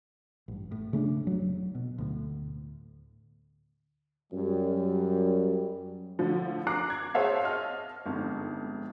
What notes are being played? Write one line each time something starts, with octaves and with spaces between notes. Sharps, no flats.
A1 G2
A2
C#3 A3 C4 D4
F1 F#3
B2
D2 A2
F#2 G3
A2 D3 F3
A#5 D6 F#6 C7
G#6
G#4 C5 C#5 E5 F5 A5
D#5 A5 F6
G1 F2 G#2